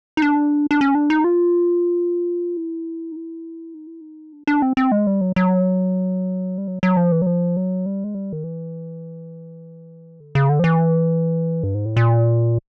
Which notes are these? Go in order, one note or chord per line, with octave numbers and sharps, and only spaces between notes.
D#4
D4
D4
C#4
D4
D#4
F4
E4
D#4
E4
D#4
E4
D#4
D4
D4
C4
C4
G#3
G3
F#3
F#3
G3
F#3
F#3
F3
E3
F#3
F3
F#3
G3
G#3
G3
D#3
E3
D3
C#3
D3
F3
E3
G2
G#2
A2
A#2